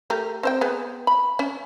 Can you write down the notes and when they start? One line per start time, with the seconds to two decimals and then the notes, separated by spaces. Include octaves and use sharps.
0.10 A3 G4 A#4
0.43 C4 C5 G5
0.61 B3 G#4
1.07 B5
1.39 C#4